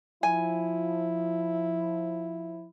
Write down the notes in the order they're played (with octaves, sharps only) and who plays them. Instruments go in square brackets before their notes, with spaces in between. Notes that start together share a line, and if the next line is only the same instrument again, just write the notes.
[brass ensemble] F3 [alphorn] E4 [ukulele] G#5